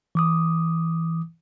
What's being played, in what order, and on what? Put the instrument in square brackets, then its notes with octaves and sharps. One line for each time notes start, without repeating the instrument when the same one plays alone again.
[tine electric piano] E3 D6 D#6